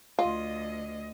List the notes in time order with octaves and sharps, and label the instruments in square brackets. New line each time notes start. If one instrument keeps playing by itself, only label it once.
[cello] D2 D#5 [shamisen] F4